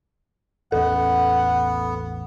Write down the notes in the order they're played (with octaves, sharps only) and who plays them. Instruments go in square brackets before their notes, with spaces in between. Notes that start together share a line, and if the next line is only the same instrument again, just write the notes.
[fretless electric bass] A1 E2 C#4 [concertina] B3 [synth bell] A4 [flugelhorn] F#5